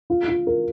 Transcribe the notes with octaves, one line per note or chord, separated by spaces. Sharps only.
F4
F4
A#4